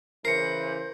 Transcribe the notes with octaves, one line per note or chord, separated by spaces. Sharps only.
C#3 E3 A#4 C5 C7 C#7